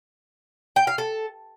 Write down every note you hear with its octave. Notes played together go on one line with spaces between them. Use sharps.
G5
F5
A4